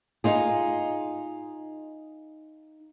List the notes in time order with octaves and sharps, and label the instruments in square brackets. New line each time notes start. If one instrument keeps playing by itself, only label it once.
[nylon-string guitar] D#4 F4 G#4